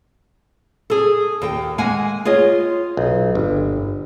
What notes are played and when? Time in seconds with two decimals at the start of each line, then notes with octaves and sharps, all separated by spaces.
0.90 G#4 A4
1.42 D#2 G5
1.78 G#3 A#3 F#5 G#5
2.25 F4 G#4 C#5 D#5
2.97 B1
3.35 G1